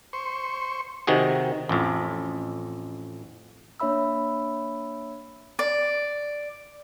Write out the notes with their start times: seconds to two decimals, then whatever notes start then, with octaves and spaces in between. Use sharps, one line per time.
0.13 C5 C#6
1.07 C3 D#3 F#4 G#4
1.69 A1 F2
3.80 A#3 D4 C#5 E5 B5 E6
5.59 D5